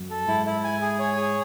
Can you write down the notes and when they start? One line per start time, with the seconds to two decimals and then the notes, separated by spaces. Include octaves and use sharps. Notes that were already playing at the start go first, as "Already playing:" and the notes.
Already playing: F#2 F#3
0.10 A4
0.28 G#2 G#3 E4
0.46 E4
0.64 G#5
0.81 G#4
0.99 C#5
1.17 G#4